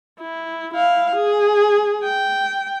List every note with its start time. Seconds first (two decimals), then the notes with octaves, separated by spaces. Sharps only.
0.20 E4
0.73 E4 F5
1.15 G#4
2.03 G5